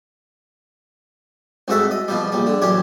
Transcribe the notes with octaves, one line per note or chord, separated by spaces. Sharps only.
C2 G#2 F#4 A4 E5
D#5
B2 F3 G3
A#1 G3
D3
A1 F#2 G4 C#5